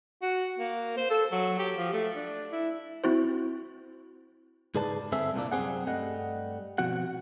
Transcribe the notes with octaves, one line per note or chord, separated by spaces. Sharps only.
F#4
A#3
C5
A4
F#3
G4
F3
A3
D4
E4
C4 E4 F#4 C5
G#2 C#3 G#4 B4 D5 A5
G2 D3 C4 G#4 E5
C2 A#2 A#3 D4
C2 F#2 G3 C4 G#4 F#5
G2 G3 A3 D#5 F#5
B2 F3 C4 F#4 F#5